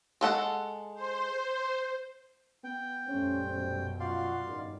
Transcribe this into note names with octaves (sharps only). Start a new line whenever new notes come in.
G#3 A4 F#5
C5
B3 G5
A#1 F#2 G3 A3 C#4 C5
B2
F4 F#4 D5 F5 F#5 C6
E2 G2 D#3